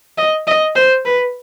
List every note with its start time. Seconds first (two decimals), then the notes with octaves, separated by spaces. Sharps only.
0.18 D#5
0.47 D#5
0.76 C5
1.05 B4